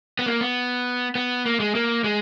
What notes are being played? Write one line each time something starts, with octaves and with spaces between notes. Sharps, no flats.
B3
A#3
B3
B3
A#3
G#3
A#3
G#3